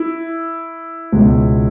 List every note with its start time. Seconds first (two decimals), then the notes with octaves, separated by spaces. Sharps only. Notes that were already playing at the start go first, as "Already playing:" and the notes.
Already playing: E4
1.12 C#2 B2